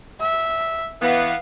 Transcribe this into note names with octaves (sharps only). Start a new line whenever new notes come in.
E5
E3 B3 F5